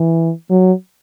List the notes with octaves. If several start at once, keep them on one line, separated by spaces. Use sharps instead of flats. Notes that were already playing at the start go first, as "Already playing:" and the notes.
Already playing: E3
F#3